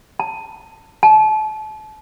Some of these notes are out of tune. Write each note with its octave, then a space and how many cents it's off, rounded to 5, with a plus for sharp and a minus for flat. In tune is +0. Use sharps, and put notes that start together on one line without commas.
A5 +15
A5 -30